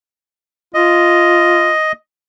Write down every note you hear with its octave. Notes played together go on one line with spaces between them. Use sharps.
F4 D#5